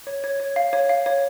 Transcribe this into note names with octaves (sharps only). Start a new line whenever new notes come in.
C#5
C#5
C#5
F5
C#5
F5
C#5